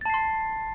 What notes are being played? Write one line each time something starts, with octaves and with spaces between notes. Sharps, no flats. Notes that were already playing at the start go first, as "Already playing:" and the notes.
A5 C6 A6 C7